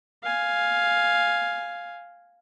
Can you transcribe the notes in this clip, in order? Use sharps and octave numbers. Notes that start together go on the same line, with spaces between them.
F5 G#5